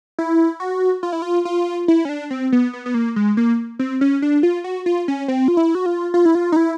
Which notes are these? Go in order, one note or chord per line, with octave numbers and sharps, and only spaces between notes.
E4
F#4
F4
E4
F4
F4
E4
C#4
D4
C4
B3
B3
B3
A#3
G#3
A#3
C4
C#4
D4
F4
F#4
F4
C#4
C4
F4
E4
F#4
F4
F4
E4
F4
D#4
E4